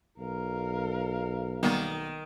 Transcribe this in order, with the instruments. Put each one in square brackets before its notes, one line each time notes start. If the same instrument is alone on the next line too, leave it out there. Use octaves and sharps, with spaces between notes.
[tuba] B1 [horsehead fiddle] A#4 F5
[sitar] D#3 [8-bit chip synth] G3 A#3 B3